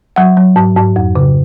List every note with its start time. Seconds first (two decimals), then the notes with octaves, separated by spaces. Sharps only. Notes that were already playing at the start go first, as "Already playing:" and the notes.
0.16 F#3 F#5
0.37 F#3
0.56 G#2
0.76 G#2
0.96 F2
1.16 C#3